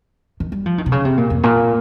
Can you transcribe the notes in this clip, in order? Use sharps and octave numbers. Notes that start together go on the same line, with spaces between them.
D#3
G3
F3
D#3
C3
C#3
C3
A#2
F2
A#2